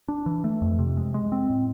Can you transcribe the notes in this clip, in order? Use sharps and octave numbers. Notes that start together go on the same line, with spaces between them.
D4
E3
A3
F2
C3
G#3
G#3
C4
A2